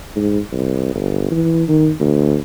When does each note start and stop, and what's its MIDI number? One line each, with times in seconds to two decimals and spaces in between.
0.16 0.39 44
0.52 0.93 36
0.95 1.30 31
1.31 1.63 52
1.68 1.90 51
2.00 2.38 38